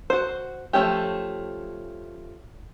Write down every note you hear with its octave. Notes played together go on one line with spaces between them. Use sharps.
F#4 C5
F3 A3 C#4 G4